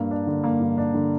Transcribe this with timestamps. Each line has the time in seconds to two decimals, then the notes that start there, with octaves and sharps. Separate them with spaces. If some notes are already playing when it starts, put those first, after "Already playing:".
Already playing: G2 A#3
0.11 D4
0.27 D3
0.44 A#3
0.60 G2
0.78 D4
0.94 D3